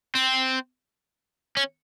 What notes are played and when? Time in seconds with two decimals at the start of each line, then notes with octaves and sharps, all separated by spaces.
0.15 C4
1.57 C#4